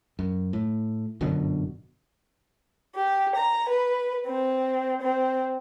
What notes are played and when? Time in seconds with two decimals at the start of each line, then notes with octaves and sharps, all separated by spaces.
0.19 F#2
0.53 A2
1.21 G1 F#2 B2 D3
2.95 G4
3.36 A#5
3.68 B4
4.27 C4
5.02 C4